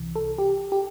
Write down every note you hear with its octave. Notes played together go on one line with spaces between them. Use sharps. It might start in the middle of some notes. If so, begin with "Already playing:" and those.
Already playing: C2 C3 E3
A4
G4
G4